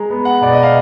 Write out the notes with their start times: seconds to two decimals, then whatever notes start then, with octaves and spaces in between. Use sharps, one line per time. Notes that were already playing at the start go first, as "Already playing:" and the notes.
Already playing: G#3 A#5
0.10 B3
0.25 F#5
0.42 B2 D5
0.53 D#5
0.63 F5